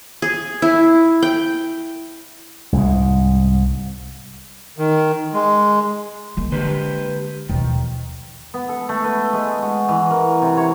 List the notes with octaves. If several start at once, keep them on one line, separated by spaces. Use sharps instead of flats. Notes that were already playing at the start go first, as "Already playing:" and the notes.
G#4
E4
G5
C2 G#2
D#3
G#3
G#3 A#3
D3 G4 B4 C5
D#2 B2 D#3 F3
B3
A4
A3
B4
G#3
F#4
E3
A#4
C3
C#5